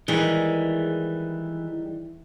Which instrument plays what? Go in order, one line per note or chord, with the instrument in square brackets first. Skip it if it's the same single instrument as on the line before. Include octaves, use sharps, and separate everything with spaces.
[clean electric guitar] D#3 G3 G#3 [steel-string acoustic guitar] E3